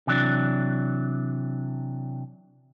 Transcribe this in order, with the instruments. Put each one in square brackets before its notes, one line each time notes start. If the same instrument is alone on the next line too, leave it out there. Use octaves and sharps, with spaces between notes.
[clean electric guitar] C3 E3 F#3 D4